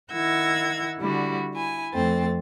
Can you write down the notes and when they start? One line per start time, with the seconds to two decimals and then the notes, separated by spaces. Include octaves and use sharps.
0.11 D#3 E4 F#5 E6 G#6 A#6
0.99 D3 G3 E4 F#4
1.54 E4 G#5
1.93 F2 A3 C4 A6